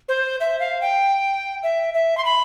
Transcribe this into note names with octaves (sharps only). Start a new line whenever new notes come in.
C5
E5
F5
G5
E5
E5
C6
B5